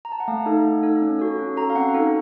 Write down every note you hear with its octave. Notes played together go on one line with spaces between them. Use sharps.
A#5
A5
F#5
A3 F5
D#4 A4
A3
D#4 A4
C#4
F#4 A4
C#4
F#4 A4 A#5
F5
C4 F#5
D#4 F#4 A4